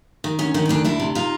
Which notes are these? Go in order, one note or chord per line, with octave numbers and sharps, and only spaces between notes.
D#3
D2 C#4
D#3 C#4
D#4
D2 D4
D2 D4 E4
C3
D#4 F4